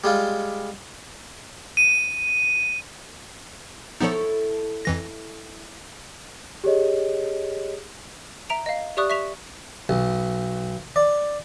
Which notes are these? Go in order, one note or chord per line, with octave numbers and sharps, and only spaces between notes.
G3 G#3 F4
D#7
F3 B3 D#4 E4 A4 C#5
F2 E3 A#6
G4 G#4 C#5 D#5
E5 A#5 D7 F7
D#5 F5
G4 D5 E5 C#6 D#6 F#6
E5 C#6 B6 E7 F7
B1
D5